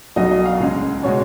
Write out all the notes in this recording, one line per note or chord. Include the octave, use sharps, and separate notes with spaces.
B1 B2 F#3 D#5
D#5
F5
C#2 C#3 G#3
B2 G#3 C#5